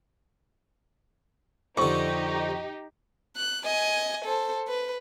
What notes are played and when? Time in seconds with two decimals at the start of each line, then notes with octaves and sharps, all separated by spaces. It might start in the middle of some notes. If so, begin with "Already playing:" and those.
1.77 F2 D3 D#4 G4 C#6
3.36 F#6
3.65 D#5 G#5
4.25 A4 C5
4.67 B4